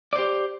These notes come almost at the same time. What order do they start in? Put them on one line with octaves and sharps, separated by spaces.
D5 C5 G4